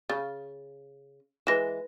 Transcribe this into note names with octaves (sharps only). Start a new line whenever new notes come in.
C#3 A6
E3 G#3 B4 A#6 E7